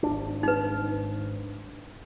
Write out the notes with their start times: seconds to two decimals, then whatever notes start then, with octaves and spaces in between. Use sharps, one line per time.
0.03 G#1 D4
0.43 D#4 B4